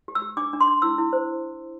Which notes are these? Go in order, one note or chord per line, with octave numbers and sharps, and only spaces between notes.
G4
E6
G4
D4 D6
D4
C6
D4
E4 E6
E4
C5